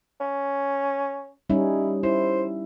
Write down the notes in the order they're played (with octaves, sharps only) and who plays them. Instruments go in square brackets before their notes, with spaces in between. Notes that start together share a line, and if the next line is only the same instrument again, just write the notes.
[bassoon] C#4
[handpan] G3 C#4 D#4 [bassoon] E4
[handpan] E4 [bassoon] C5